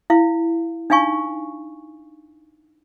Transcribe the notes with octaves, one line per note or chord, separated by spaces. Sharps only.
E4 F5
D4 D#4 F5 G#5 C#6